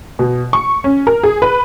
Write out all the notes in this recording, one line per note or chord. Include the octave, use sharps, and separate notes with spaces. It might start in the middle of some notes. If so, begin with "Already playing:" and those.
B2
C#6
C#4
A#4
G#4
B4